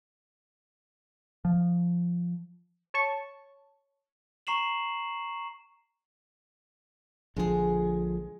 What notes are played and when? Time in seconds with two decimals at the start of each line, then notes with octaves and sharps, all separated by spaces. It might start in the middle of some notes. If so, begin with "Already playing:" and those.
1.45 F3
2.94 C#5 A5 C#6
4.47 A#5 C#6 C7 E7 F#7
7.36 A#1 D3 F3 G#3 G#4